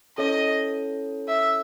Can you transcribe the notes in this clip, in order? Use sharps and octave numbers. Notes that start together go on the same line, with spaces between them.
C#4 E4 A4 C#5 D#5
E5